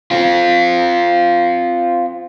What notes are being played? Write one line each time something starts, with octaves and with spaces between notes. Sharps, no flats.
C4 F4